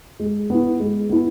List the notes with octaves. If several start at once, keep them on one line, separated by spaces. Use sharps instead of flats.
G#3
B3 E4
G#3
B3 E4